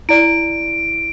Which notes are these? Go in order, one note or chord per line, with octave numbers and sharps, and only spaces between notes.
E4 D5 D7